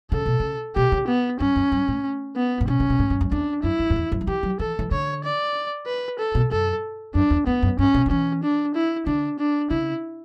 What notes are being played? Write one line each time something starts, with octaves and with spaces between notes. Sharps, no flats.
C#3 A4
B2
C#3
B2 G4
C#3
B3
G2 C#4
F#2
G2
A2
B3
A2
B2 C#4
C#3
B2
A2
G2
F#2
E2 D4
F#2 E4
F#2
F#2
E2
F#2
F#3
E3 G4
F#3
E3 A4
E3
D3 C#5
D5
B4
A4
B2
F#2 A4
F#2 D4
E2
E2 B3
F#2
G2 C#4
B2
D3
E3 C#4
D4
E4
D3 D4
D4
C#3 E4